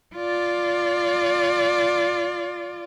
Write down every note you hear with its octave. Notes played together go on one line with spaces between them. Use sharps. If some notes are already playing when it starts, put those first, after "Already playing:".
F4 D5